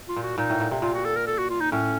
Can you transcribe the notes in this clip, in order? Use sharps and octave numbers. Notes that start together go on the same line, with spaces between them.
F4
A#2
F#4
A#2 D#4
A2
A#2
C3
A#2 F4
F#4
A4
A#4
A4
F#4
F4
D#4
A2 C#4